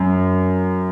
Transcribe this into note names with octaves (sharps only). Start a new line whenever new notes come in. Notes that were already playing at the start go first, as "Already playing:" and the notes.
Already playing: F#2